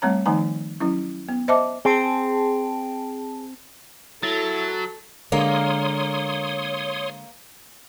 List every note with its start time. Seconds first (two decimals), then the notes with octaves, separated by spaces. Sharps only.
0.02 G3 A3 C4 C#5 A#5
0.26 D#3 F3 A3 D#4 G#5 A#5
0.80 F#3 C#4 E4
1.29 B3
1.48 C5 D#5 E5 A5 D6
1.85 C4 G#4 A5
4.23 F#3 E4 A4 A6
5.32 D3 G#3 A#3 C#5 C6 D#6